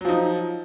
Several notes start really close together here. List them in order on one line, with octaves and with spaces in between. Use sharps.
F#3 F3 D#4